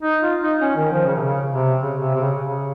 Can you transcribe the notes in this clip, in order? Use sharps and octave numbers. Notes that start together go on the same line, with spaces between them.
D#4
F4
D#4
C#4
D#3
F3
C#3
C3
C#3
C3
C#3
C3
C3
C#3
C#3